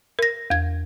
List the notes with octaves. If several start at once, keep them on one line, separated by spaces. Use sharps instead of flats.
A#4 A#6
E2 G#6